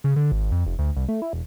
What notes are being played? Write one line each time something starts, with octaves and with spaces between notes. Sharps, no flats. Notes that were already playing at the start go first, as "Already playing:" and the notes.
C#3
D3
G#1
F2
F1
D2
C2
A3
E4
E1